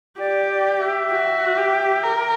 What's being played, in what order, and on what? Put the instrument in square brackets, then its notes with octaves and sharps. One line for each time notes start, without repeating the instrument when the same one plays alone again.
[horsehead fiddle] G4 [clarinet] D5
[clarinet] D5
E5
[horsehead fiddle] F#4
G4
A#4